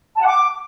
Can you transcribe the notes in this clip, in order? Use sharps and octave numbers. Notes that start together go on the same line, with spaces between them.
A5
F#5
D6